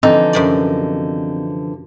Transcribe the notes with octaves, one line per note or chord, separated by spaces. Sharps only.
D3 E3 F3 C4 D#4
F#2 C3 D5